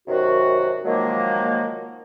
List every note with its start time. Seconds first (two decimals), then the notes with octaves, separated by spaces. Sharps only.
0.08 F#2 C3 D#3 F#4
0.85 D#3 F3 F#3 G#3 A#3